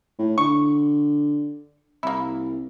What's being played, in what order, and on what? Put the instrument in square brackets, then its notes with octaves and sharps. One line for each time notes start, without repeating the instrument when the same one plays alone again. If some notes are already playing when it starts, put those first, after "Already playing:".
[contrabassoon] A2
[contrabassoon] D3 [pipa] C#6
[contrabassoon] C2 [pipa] A#3 E4